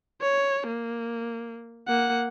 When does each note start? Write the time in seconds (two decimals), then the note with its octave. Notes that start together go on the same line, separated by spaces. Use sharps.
0.21 C#5
0.67 A#3
1.88 A#3 F#5